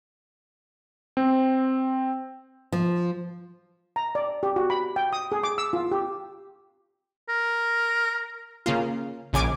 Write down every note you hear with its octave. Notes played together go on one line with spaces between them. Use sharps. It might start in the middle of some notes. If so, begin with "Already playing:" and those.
C4
F3
A#5
D5
G4
F#4
B5
G5
D#6
G#4
D6
E6
F4
G4
A#4
C#3 A#3 F4
A#1 C#3 G#5 D6